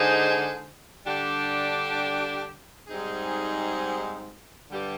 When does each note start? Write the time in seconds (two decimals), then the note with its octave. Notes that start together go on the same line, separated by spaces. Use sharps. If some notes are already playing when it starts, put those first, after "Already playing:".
Already playing: D3 G#3 D#4 G#4 C5
1.06 D3 G3 D4 G4
2.87 G#2 G3 C4 D#4 G#4
4.71 G2 D3 G3